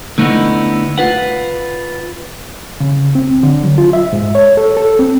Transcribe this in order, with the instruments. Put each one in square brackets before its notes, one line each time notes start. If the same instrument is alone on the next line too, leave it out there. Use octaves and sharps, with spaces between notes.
[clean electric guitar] D3 A3 B3 D#4 E4
F4 B4 F#5
[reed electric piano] C#3
C4
C2
D3
F#3
F4
E5
G#2
C#5
A4
A4
C4